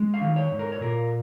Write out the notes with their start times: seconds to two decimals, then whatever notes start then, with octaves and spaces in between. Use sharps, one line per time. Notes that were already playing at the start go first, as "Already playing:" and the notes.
Already playing: G#3
0.14 F5
0.21 D#3
0.36 C#5
0.52 G#2
0.59 A#4
0.72 C#5
0.81 A#2 A#4